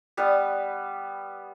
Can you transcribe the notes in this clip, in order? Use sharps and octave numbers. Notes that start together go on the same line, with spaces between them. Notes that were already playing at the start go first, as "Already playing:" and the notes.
G3 B3 B4 D#6